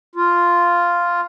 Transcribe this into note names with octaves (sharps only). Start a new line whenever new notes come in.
F4